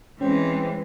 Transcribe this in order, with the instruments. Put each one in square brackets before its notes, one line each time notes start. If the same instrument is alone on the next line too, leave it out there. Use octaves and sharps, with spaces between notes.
[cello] E3 G#3 [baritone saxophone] C4 [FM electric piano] C#4